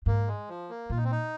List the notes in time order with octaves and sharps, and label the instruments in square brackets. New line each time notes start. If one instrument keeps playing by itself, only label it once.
[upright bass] G#2 [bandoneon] A#3
[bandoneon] G#3
F3
A#3
[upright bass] A#2 [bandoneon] F4
[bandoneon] D#4
C4
D#4